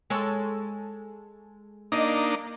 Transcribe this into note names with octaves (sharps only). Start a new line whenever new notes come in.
G#3 A4 C#5
A#3 D4 D#4 D#5